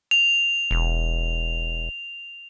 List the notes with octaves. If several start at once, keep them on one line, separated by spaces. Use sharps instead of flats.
F7
E1